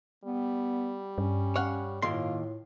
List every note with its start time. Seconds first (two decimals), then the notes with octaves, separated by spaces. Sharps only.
0.24 G3 B3
1.18 G2 C#4
1.56 C#5 F5 F#5
2.02 D#2 A2 A#3 F4 C6